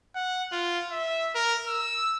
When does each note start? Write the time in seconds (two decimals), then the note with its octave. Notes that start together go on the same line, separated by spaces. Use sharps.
0.15 F#5
0.52 F4
0.91 E5
1.35 A#4
1.67 E6